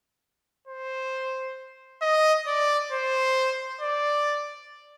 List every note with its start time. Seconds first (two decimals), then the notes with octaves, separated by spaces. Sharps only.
0.68 C5
2.02 D#5
2.47 D5
2.92 C5
3.82 D5